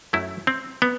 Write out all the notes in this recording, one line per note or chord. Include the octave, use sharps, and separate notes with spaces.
F#2 F#3 A3 E4
C4
B3